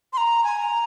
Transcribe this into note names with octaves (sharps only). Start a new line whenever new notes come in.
C6
A#5
G#5
A#5